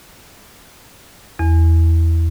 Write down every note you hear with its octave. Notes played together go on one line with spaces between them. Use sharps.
E2